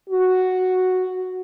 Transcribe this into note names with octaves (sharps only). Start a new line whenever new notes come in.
F#4